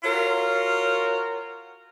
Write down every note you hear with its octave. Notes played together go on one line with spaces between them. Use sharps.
F4 F#4 A#4 C#5